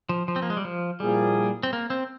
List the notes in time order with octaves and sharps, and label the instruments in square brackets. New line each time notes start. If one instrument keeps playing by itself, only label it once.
[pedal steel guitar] F3
F3
C4
A#3
G#3
G3
F3
[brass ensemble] A#2 F3 A#3 E4 G#4 [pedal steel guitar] G3
[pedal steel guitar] C4
A#3
C4